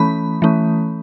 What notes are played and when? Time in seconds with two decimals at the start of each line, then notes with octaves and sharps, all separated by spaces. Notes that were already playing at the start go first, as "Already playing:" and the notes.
Already playing: E3 A3 C#4 B5
0.42 E3 A3 C#4